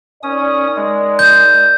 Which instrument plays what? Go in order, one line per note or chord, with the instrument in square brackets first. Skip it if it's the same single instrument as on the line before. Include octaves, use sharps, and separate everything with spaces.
[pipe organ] C#4 D#6 [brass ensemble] D#4 A#4 D5
[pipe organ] G#3
[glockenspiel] G6